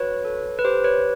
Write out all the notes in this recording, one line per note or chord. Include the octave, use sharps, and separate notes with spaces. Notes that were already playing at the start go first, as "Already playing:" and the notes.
Already playing: F#4 B4 C#5
A4
B4
G4 C5
B4 C#5